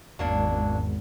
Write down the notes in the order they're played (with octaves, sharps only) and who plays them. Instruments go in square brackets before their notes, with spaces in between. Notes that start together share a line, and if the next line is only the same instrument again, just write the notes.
[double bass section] G#1 [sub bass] E2 [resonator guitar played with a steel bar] F#3 A#3 D4